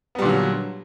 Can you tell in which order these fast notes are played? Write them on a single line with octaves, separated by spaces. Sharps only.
B3 G3 A#2 D3 F#3